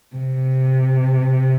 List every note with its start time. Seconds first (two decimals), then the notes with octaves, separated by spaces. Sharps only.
0.16 C3